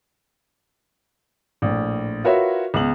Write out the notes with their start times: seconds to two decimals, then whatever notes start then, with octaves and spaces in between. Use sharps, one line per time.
1.62 A#1 A2
2.24 F4 F#4 A#4 B4 C#5 E5
2.74 C#2 B3 F#7